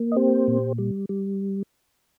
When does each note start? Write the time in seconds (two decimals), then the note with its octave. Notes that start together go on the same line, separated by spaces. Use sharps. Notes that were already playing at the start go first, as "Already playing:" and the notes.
Already playing: A#3
0.12 D#5
0.16 C4 G4 C5
0.48 A#2
0.78 G3
1.09 G3